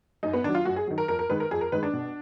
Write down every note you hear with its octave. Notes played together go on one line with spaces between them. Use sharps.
F#2 D#4
B3
D#3 F#3 D4
F4
F#2 F#4
G#4
D#3 F#3
A#4
F2 A#4
A#4
D#3 G#3 B4
A#4
F2 G#4
A#4
D#3 G#3 B4
D4
B2